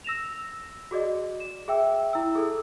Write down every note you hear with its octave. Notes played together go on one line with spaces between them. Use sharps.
E6 A#6 E7 F7
F#4 G#4 D5 D#5
E7
G#4 E5 G5 E6
E4 E6
G#4 A4